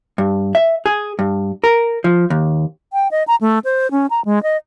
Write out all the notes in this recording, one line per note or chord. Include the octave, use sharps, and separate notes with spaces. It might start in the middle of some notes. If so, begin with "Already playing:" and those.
G2
E5
G#4
G2
A#4
F3
D#2
G5
D#5
A#5
A3
C5
C#4
A#5
G#3
D#5